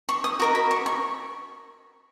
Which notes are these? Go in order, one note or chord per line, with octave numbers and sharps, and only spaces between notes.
C#6
D#6
F#4 A#4 D#5 C#6
B5
C#6
C#6